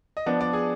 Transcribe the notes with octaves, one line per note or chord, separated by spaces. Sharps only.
D#5
F3 B3 D4 D5
D5
G#4